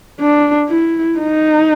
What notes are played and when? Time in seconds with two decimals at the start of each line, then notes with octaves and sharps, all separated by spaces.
0.20 D4
0.69 E4
1.19 D#4